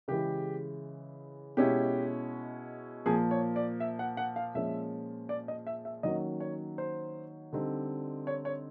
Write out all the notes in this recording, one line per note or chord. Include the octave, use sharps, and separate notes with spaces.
C#3 E3 G#3 G4
B2 G#3 C#4 E4 G4
A#2 F3 A#3 G#4
C#5
D5
E5
F#5
F#5
F5
A#2 F3 G#3 C#4 E5
D5
D#5
E5
E5
D#3 F#3 A#3 C#4 D#5
C#5
C5
D3 G3 C4 D#4
C#5
C#5